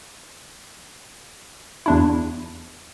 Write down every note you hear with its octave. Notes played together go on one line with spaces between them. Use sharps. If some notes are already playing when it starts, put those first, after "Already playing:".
E2 D4 E4